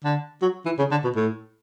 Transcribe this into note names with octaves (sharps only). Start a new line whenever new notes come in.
D3
F#3
E3
C#3
D3
B2
A2